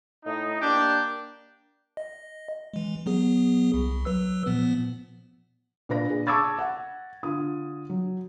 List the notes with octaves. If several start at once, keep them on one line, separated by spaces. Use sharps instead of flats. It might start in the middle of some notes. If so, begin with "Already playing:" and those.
A2 D#4
A#3 D4 G4
D#5
E3 G#3
F#3 B3 G#4
C2
F#3 B4 E6
A#2 F3 B3
A#2 D4 B4 A#6
D4 G#4
A5 C#6 D6 E6 G#6 A6
F#5
D3 F4 D#6
F#3